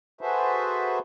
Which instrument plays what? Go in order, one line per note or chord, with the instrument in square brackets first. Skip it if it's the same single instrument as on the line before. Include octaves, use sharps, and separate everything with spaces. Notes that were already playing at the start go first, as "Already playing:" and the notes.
[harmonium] F#4 G#4 A4 B4 C5 E5